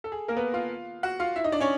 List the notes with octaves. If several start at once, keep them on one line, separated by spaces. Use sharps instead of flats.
A4
G#4
A#3 A#4
B3 B4
F4 F5
F#4 F#5
F4 F5
E4 E5
D#4 D#5
D4 D5
C#4 C#5